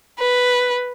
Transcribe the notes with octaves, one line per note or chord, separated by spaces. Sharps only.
B4